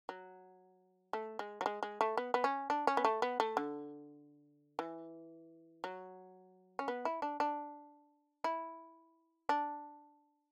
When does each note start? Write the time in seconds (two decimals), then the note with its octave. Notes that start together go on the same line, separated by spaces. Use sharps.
0.09 F#3
1.13 A3
1.39 G#3
1.61 F#3
1.66 G#3
1.83 G#3
2.01 A3
2.17 B3
2.34 B3
2.44 C#4
2.70 D4
2.87 C#4
2.97 B3
3.05 A3
3.22 B3
3.40 A3
3.57 D3
4.79 E3
5.84 F#3
6.79 C#4
6.88 B3
7.05 E4
7.22 D4
7.40 D4
8.44 E4
9.49 D4